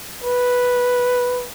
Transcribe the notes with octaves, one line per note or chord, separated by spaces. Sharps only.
B4